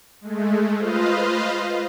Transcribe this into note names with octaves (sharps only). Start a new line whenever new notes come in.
G#3 A3
F4 B4 C5 D#5 F5